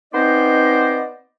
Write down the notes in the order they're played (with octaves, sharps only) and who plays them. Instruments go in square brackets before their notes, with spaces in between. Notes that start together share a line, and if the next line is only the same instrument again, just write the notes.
[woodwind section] B3 C4 D#4 C5 D5 D#5